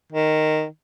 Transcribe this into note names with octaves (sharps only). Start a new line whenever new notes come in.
D#3